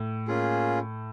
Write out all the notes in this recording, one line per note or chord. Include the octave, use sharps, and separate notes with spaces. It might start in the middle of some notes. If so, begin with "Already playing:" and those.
Already playing: A2
A#3 C#4 F4 G#4